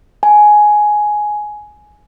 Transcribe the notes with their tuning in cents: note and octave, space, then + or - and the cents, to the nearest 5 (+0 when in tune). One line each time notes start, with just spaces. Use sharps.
G#5 +10